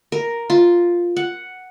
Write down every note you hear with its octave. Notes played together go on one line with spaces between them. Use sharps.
A#4
F4
F#5